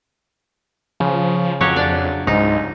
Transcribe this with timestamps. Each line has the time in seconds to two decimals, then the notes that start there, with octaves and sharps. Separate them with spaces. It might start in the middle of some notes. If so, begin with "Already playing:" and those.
1.00 C#3 F3
1.61 F2 F#3 G4 C#5
1.76 D4 D5
2.27 C#2 G#2 D#4